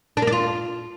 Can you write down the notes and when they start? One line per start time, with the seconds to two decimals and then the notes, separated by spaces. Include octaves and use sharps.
0.17 D4
0.22 A#3
0.27 D4
0.32 F4